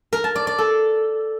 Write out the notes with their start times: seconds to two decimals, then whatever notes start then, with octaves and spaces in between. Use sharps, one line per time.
0.13 A#4
0.24 A5
0.36 D5
0.47 D5
0.58 A4